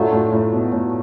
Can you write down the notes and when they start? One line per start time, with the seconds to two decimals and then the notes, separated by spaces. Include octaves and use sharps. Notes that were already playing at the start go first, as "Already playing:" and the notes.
Already playing: A2 F#3 A3 D4 F4
0.12 A2
0.32 A2
0.53 B2
0.72 A2